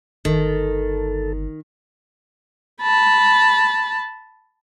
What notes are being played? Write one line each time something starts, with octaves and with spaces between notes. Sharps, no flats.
G1 D#3 A4
A5 B5